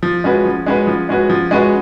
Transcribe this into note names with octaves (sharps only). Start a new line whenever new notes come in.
F3
G#3 C#4 F#4 B4
F3
G#3 C#4 F#4 B4
F3
G#3 C#4 F#4 B4
F3
G#3 C#4 F#4 B4